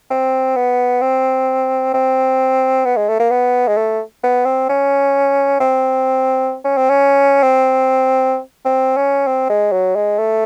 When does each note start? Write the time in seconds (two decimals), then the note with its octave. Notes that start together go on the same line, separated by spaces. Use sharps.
0.11 C4
0.56 B3
1.02 C4
1.94 C4
2.85 B3
2.97 G#3
3.09 A3
3.20 A#3
3.31 B3
3.68 G#3
3.77 A3
4.24 B3
4.45 C4
4.69 C#4
5.60 C4
6.65 C#4
6.77 C4
6.90 C#4
7.43 C4
8.65 C4
8.97 C#4
9.27 C4
9.50 G#3
9.72 F#3
9.96 G#3
10.19 A3